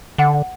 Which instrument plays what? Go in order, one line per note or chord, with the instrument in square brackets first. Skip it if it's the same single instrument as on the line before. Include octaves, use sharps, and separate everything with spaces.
[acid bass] D3 [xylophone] F#5